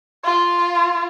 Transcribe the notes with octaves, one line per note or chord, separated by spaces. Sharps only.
F4